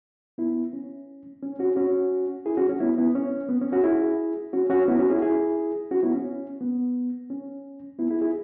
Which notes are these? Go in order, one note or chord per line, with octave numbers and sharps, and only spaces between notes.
B3 E4
C#4
C#4
C#4 F#4
C#4 F#4
E4 G#4
C#4 F#4
C#4
B3 E4
B3 E4
C#4
B3
C#4
C#4 F#4
E4 G#4
C#4 F#4
C#4 F#4
B3 E4
C#4 F#4
E4 G#4
E4 G#4
C#4 F#4
B3 E4
C#4
B3
C#4
B3 E4
E4 G#4
E4 G#4